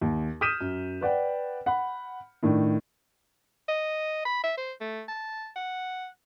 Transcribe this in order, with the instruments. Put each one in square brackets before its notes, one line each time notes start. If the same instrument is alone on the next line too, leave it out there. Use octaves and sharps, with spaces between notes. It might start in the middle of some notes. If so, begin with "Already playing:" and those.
[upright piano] D#2
D#6 F6 G6 B6 D#7 E7
F#2
B4 D5 F#5 G5
F#5 B5
A2 D#3 D4
[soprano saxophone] D#5
B5
E5
C5
A3
A5
F#5